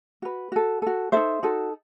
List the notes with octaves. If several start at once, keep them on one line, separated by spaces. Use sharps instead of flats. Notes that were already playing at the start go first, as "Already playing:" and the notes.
F#4 B4
F#4 A4
F#4 A4
D#4 F#4 A4 C5 E5
D#4 F#4 A4